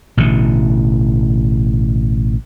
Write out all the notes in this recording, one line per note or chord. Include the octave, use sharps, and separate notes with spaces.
A1 B2 D3 E3